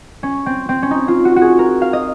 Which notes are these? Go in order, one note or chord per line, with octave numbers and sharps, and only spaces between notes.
C#4
C4
C4
C#4
D#4
F4
F#4
F#4
G#4
A#4
F5
D#5